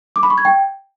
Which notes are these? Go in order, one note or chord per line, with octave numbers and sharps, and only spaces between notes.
D6
B5
C#6
G#6
G5